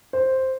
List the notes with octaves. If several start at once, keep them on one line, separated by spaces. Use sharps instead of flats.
C5